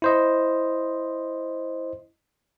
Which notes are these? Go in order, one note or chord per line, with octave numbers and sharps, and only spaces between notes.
E4 C5 D#5